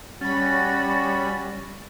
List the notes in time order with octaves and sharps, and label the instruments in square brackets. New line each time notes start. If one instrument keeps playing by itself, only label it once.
[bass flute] G3 [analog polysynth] C#4 B5 [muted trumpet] F#4 [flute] A6